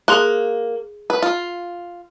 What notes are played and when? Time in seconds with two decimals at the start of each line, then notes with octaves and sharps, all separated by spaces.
0.08 A#3 G#4 C6 F#6
1.10 B4
1.22 F4